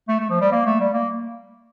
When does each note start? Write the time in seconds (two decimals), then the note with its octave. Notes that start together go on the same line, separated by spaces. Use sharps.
0.08 A3
0.20 A3
0.30 F3
0.41 G3
0.52 A#3
0.66 A3
0.80 G3
0.93 A#3